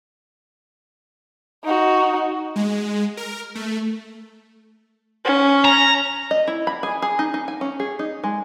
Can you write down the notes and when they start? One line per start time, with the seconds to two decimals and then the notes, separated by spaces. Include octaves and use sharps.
1.64 D#4 F#4
2.56 G#3
3.17 A#4
3.55 A3
5.25 C#4
5.65 A#5
6.31 D#5
6.47 E4
6.67 B5
6.83 G#4
7.02 G#4
7.19 D#4
7.34 D#4
7.48 G#5
7.61 C#4
7.80 G#4
7.99 D#4
8.24 G#3